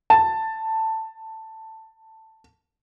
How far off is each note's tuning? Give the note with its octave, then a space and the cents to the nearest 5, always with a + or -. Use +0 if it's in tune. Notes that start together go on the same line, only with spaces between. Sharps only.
A5 +10